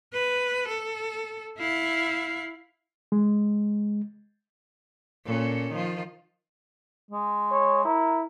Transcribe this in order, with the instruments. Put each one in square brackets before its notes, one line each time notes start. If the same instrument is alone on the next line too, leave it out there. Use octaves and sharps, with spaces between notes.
[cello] B4
A4
E4 F5
[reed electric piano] G#3
[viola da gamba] A#2 C#4 A4
D#3 F3 F4
[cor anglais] G#3
[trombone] C#5
[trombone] E4 [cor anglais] A#4